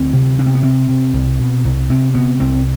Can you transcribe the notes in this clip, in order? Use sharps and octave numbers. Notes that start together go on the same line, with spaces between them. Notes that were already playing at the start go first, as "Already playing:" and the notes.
Already playing: D2 C4
C3
C3 D4
C4
B3
C3 C4
C3
C2
B2
C2
C3 C4
C3 B3
C2 C4